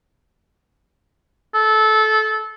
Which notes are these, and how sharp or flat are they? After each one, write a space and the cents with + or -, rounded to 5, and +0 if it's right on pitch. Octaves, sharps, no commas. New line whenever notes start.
A4 -20